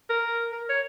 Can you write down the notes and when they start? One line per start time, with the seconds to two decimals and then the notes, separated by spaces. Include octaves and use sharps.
0.09 A#4
0.52 A#4
0.69 C#5